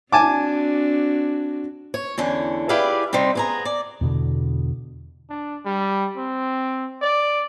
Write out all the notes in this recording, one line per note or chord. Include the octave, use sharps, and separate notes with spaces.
C4 D4 F#4 G#5 A5 D6
C#5
E2 D3 C#4
E4 G4 G#4 B4 D5 F5
C3 G3 C4 D#4
B3 G#4 A#5
D5
E2 B2 D3
D4
G3
C4
D5